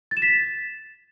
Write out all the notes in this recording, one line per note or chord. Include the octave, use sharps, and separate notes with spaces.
A6
E7
B6
A6